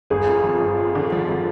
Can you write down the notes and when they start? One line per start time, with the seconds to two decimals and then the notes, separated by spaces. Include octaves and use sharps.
0.10 G1 G#4
0.26 F2
0.43 F3
0.60 G1
0.77 F2
0.95 D3
1.12 F3
1.29 F3